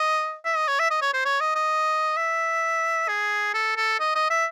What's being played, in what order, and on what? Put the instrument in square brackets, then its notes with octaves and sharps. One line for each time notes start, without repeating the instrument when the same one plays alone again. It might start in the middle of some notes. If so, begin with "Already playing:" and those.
Already playing: [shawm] D#5
E5
D#5
C#5
E5
D#5
C#5
C5
C#5
D#5
D#5
E5
G#4
A4
A4
D#5
D#5
E5